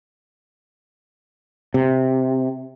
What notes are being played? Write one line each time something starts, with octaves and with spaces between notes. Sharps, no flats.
C3